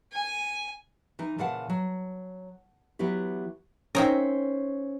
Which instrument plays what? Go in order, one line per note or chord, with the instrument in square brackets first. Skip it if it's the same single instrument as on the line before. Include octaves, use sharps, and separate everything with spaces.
[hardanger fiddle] G#5
[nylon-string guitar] E3 D#4
A#2 C#3 E3 F5 F#5 A5
F#3
E3 F#3 B3 E4 G4
[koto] C4 D#4 A#4 [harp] C#4 C5 E5